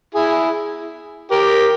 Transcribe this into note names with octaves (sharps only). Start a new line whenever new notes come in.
E4 G#4
G4 A#4